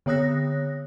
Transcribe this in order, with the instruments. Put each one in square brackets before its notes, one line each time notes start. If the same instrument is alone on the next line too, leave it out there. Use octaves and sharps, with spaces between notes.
[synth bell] D3 B3 C#5 D#6 F#6 A#6